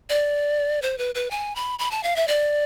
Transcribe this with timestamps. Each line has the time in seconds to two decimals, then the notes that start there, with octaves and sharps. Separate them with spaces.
0.10 D5
0.82 C5
0.98 B4
1.15 B4
1.31 G#5
1.56 B5
1.79 B5
1.91 A5
2.03 F5
2.16 E5
2.28 D5